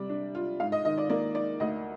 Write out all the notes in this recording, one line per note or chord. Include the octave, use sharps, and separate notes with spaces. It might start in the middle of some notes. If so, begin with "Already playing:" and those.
Already playing: C3 G3 D5
D4
F4
G#2 F5
D#5
D#3 D#5
D5
A#3 D5
D#4 D5
D2 D#5